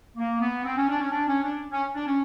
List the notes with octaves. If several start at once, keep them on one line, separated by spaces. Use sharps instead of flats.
A#3
B3
C4
C#4
D4
C#4
D4
C#4
D4
C#4
D4
C#4